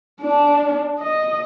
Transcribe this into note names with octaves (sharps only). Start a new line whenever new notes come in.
D4
D#5